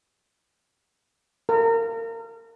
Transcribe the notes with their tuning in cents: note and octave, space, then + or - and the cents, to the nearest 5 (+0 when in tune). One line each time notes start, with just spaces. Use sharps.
A#4 -30